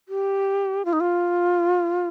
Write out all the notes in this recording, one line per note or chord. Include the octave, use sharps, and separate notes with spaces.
G4
F4
D#4
F4